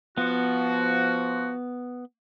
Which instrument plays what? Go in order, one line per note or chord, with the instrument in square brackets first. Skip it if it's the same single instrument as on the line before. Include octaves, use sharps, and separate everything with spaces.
[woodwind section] F3 F#4 [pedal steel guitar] B3